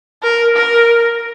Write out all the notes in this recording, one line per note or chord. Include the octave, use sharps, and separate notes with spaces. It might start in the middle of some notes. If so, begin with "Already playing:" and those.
A#4
A#4